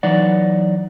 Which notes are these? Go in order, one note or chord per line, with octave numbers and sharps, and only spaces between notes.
E3 F#3 D#4 D5 F#5